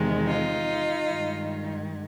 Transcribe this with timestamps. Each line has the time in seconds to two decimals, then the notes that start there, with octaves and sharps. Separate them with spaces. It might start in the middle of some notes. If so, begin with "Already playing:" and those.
Already playing: E2 C3 D#3 G#3
0.27 D#4 F4
1.06 G2 D#3 G#3